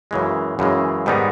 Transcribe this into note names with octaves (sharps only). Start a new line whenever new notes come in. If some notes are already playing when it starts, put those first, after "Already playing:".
F#2 C#3 E3 G#3
F#2 C#3 E3 G#3
G#2 D#3 G3 B3 D#4